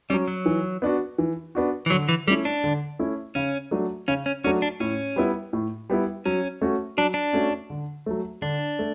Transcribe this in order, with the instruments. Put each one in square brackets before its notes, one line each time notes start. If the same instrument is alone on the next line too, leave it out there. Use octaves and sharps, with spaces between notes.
[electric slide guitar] G3 [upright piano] C#4
[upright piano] F#3
[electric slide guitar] F#3
[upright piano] E3
B3 D4 F#4
E3
B3 D4 F#4
[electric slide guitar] E3
[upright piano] D3 [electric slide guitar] F#3
[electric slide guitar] E3
[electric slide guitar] G3 [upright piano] A3 C#4 E4
[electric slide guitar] D4
[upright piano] D3
A3 C#4 E4
[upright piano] C#3 [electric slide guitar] C#4
[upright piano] F#3 A3 D4 F#4
[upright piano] C#3 [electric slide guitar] C#4
[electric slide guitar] C#4
[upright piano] F#3 A3 D4 F#4 [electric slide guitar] C#4
[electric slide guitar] D4
[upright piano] A2 [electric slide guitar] C#4
[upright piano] G3 B3 E4
A2
G3 B3 E4
[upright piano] F#3 [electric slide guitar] C#4
[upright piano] A3 C#4 F#4
[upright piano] F#3 [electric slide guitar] D4
[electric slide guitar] D4
[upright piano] A3 C#4 F#4
D3
F#3 A3
[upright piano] D3 [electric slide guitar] D4
[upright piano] A3